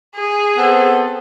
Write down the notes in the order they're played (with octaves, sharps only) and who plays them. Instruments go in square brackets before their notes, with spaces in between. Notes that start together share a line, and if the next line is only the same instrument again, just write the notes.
[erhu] G#4
[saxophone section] B3 C4 A4